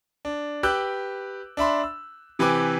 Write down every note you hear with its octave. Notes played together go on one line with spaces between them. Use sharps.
D4
G4 B4 D6 E6 F#6 G6
D4 E5 B5 C6
E6
C3 E3 G4 B4 G#5 D6